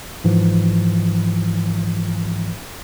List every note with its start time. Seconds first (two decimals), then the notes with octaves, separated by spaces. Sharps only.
0.24 G#2 E3 F3